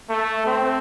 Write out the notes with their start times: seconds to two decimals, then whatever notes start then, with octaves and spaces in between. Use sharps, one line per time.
0.10 A3
0.46 C4